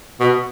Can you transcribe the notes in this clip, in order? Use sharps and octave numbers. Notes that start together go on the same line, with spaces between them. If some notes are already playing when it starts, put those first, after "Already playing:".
B2